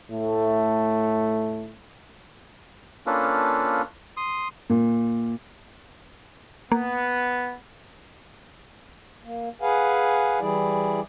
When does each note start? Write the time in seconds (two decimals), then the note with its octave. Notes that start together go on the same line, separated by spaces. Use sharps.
0.11 A2 A3
3.07 A#3 C#4 D4 F4 A4 B4
4.17 C6 D#6
4.70 A#2
6.72 A#3 B3
9.24 A#3
9.62 G#4 B4 F5 F#5 G#5
10.40 E3 G3 E4 G#4 D5